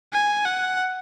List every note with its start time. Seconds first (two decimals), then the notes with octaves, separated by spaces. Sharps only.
0.13 G#5
0.46 F#5